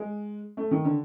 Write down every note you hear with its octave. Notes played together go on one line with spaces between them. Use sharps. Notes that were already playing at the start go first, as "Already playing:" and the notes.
Already playing: G#3
A3
D#3
D3